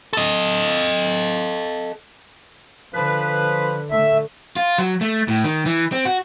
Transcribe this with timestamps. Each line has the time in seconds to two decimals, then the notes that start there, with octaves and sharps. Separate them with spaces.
0.13 A4 D#5
2.94 D3 F3 B4
3.91 D3 A3 E5
4.56 F4
4.78 F#3
5.01 A3
5.28 A2
5.44 D#3
5.66 E3
5.92 C4
6.05 F#4